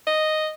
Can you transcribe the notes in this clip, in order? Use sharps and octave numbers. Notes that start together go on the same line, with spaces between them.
D#5